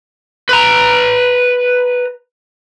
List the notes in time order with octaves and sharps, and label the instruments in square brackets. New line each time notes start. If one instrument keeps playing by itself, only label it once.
[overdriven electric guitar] B4 A#5